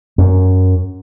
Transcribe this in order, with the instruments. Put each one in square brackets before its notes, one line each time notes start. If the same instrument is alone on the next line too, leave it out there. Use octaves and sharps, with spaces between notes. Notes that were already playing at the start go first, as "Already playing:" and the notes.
[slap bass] F#2